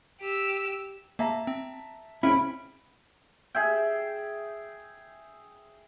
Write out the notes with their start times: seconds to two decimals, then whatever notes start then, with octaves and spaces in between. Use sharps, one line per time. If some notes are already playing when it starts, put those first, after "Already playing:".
0.21 G4 E6
1.19 A#3 E5 A5 A#5
1.47 C4
2.23 C#2 C4 C#4 E4 B5 D7
3.55 G#4 E5 G5